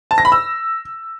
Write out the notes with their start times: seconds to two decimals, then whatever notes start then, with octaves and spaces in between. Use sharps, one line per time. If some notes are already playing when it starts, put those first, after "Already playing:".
0.11 A5
0.18 A#6
0.25 B5
0.32 E6